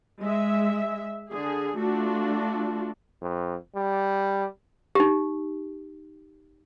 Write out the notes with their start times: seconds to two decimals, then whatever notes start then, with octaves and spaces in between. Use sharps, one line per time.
0.21 G#3 E5
1.31 D3 G#4
1.78 A3 D4 F4 F#4
3.22 F2
3.76 G3
4.95 D#4 G4